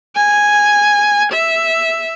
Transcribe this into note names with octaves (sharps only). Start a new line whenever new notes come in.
G#5
E5